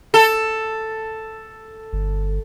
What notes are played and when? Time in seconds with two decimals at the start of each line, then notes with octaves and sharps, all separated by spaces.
0.14 A4
1.93 G1